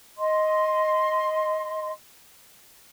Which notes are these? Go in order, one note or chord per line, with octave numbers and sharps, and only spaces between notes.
D#5 C6